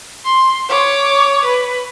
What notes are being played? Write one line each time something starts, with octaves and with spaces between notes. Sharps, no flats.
C6
C#5 D6
B4